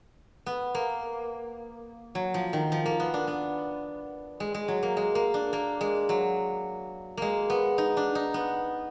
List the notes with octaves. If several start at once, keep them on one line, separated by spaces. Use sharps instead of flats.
B3
A#3
F#3
F3
D#3
F3
A#3
B3
D4
B3
G#3
G#3
F#3
A#3
G#3
A#3
D4
A#3
G#3
F#3
G#3 A#3
B3
D#4
D4
D#4
B3